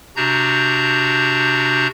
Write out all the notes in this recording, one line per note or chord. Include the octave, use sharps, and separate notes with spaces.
C3 D4 F#4 A5 A#5 G6